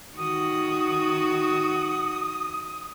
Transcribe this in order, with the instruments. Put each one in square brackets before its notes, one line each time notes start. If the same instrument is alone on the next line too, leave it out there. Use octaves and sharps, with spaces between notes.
[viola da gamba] D#3 F#4 [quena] D#6